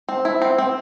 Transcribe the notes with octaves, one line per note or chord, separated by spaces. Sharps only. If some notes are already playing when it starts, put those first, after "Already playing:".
C4
E4
C4
C4